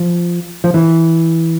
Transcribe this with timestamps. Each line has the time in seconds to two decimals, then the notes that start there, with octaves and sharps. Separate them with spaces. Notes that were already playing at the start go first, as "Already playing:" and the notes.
Already playing: F3
0.64 F3
0.74 E3